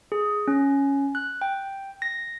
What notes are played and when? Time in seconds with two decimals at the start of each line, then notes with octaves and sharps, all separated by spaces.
0.12 G#4
0.48 C#4
1.15 F#6
1.41 G5
2.02 A#6